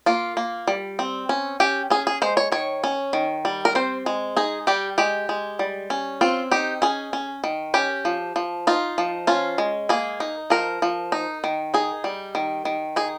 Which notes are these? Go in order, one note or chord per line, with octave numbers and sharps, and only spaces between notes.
A#3 F4
A#3
G3
C4
C#4
C#4 G4
C#4 G#4
G#4
G#3 C5
C#5
D#3 C#5
C#4
D#3
G3
A#4
C4 C5
G#3
D#4 G#4
G3 G4
G#3 G4
G#3
G3
C#4
C4 F4
D#4 G4
C#4 G#4
C#4
D#3
C#4 G4
F3
F3
D#4 F4
F3
C#4 F4
G#3
A#3 G#4
D#4
F3 A#4
F3
D#4
D#3
D#4 G#4
G3
D#3
D#3
D#4 G#4